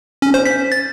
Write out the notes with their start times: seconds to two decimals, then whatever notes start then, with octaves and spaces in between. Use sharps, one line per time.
0.22 C#4
0.34 C5
0.45 B6
0.72 A6